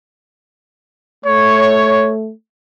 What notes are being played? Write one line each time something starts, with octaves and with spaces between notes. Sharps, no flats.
A3 C#5